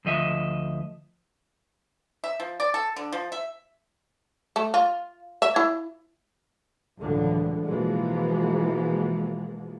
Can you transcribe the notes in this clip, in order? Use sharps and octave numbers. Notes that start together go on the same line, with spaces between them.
D2 F3 D#5 E5
E5
F3
D5
A4
D3
F3
E5
A3
F4
E5
E4
C#2 F#2 A2 D3 E3 F3
B2 E3 F3 G#3 A#3